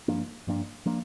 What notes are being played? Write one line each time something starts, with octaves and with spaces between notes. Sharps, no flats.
G2 F3 A#3 D4
G2 F3 A#3 D4
F3 A#3 D4